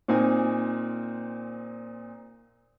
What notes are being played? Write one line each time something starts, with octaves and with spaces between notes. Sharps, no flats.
A#2 C4 D#4 G#5